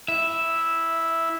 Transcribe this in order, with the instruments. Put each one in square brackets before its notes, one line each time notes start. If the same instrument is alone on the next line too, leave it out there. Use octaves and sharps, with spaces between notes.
[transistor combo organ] E4 [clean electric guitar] E5